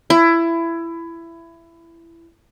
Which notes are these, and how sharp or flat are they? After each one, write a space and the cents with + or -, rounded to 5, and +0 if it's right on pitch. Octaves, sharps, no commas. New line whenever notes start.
E4 +20